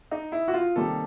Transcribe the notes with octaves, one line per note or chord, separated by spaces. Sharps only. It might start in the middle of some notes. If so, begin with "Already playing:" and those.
D#4
E4
F#4
F4
C3 D#3 G3 A#3 A4